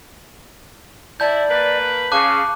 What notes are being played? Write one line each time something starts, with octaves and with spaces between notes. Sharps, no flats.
E4 D5 A5 G6
A#3 B4
C#3 F5 A5 D6 F#6